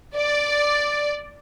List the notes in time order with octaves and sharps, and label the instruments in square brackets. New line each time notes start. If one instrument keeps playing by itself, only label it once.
[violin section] D5